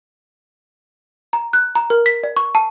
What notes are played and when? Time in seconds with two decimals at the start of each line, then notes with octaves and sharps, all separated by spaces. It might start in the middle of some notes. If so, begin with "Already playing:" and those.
1.33 A#5
1.53 F#6
1.75 A#5
1.90 A#4
2.06 B6
2.23 D5
2.37 C#6
2.55 A5